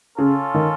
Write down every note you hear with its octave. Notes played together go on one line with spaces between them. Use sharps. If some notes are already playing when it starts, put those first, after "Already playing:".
C#3 C#4 F4 A4
D#3